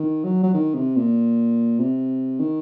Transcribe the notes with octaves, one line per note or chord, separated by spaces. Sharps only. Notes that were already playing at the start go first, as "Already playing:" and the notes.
Already playing: D#3
F#3
F#3
D#3
C3
A#2
C3
D#3